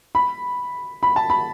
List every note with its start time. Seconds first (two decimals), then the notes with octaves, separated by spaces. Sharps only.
0.15 B5
1.03 B5
1.16 A5
1.30 B5